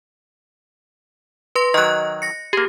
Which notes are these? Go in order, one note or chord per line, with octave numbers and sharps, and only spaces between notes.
B4 C6 A#6
D#3 F#3 D#5 F#6
A#6 C#7
A#3 G4 G#4